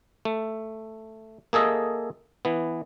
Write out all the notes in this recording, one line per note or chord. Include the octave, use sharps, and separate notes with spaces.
A3
A#3 G#4 A4 D#5 E5
E3 B3